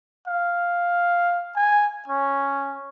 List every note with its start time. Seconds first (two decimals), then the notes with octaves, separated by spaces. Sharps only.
0.27 F5
1.56 G#5
2.08 C#4